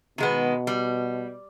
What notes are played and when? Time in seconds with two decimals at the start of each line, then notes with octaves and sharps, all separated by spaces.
0.18 B2 D#3 G#3 B3
0.67 G3